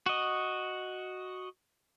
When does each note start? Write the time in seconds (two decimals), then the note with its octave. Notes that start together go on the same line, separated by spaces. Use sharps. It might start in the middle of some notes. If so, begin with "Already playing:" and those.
0.06 F#4 D#5